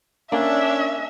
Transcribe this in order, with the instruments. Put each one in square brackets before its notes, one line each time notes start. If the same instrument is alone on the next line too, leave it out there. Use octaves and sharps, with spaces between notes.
[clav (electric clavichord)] A#3 [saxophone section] C#4 D4 [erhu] E5